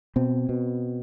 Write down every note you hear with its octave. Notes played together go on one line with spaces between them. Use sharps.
B2 C4
B2